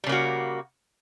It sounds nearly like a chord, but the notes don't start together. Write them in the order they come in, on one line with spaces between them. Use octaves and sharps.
G3 C#3 A#3 F#4